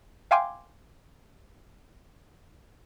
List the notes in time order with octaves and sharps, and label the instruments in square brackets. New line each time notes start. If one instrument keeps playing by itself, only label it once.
[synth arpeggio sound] E5 F5 G5 G#5 C6 D6